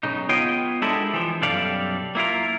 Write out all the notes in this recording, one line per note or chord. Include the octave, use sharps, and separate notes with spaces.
B1 C#3 D#4
B3 F4 C#5 D#5 F5 G5
G#3 D4 E4 G4 A4 A#4
E3 F3
B1 F#2 G3 A4 D5 F5
A#3 E4 F4 A#4